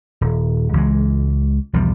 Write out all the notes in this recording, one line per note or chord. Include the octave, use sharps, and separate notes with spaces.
D#1
C#2 E3 G#3
B1 E2 F3 G3